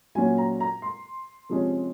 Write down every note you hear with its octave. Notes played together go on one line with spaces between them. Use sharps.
A#2 F#3 C#4 G#5
A#5
A#5
C6
C3 F3 G#3 C#4